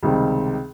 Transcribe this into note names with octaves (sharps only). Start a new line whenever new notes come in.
C#2 C3 D#3 G3 C4